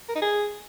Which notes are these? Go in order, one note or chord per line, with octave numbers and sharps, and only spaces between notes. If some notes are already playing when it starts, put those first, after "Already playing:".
A#4
D#4
G#4